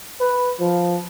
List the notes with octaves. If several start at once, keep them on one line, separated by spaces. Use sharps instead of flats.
B4
F3